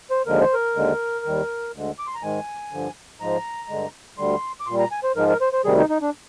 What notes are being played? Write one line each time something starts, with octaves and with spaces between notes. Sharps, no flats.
C5
D#2 D3 F3 G#3 A#4
C5
A#4
D#2 D3 G#3
D#2 D#3 G3
D2 D3 G#3
D6
C6
A#5
G#2 D#3 G#3 G#5
G2 D3 F3
G#2 F3 G#3 A#5
G2 D3 G#3
D2 D3 G3 C6
D6
A#2 G3 C6
A#5
G#5
C5
G#2 F3 G#3 A#4
A#4
C5
C5
D2 C3 D#3 G3 G#4
D#4
D#4
D4